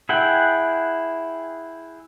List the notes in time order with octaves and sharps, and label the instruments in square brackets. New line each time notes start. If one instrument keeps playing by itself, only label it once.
[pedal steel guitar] E4 G#4 F#5 G5